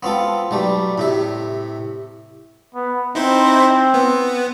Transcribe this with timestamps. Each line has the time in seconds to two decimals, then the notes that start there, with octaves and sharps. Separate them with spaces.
0.03 B3 C4 F4 A4
0.51 B1 G3 A3
0.98 A2 C3 E5
2.75 B3
3.15 C4 D#4 E4 C5
3.94 B3